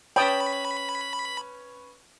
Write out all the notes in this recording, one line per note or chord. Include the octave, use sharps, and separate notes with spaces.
C#4 B4 C#5 G5 A5 B5 D#6